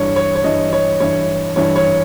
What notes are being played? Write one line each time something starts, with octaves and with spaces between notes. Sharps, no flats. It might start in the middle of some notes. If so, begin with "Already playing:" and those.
Already playing: G2 E3 C#5
C#5
C#5
G2 E3 D#5
C#5
G2 E3 C#5
G2 E3 C#5
C#5